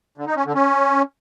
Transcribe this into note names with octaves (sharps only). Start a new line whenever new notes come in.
D3
D#4
C#4
D3
C#4